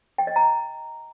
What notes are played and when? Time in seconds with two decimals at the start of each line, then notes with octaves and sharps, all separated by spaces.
0.18 G5
0.27 D#5
0.36 A#5